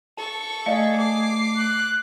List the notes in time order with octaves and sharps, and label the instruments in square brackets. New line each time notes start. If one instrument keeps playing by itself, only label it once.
[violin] A4 C#6 [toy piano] A5
[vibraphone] A3 [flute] G#4 [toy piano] D5 D#5 F5
[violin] D6 C7
[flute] F#6